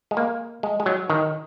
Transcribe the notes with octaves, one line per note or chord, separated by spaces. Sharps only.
G#3
A#3
G#3
G#3
F#3
D#3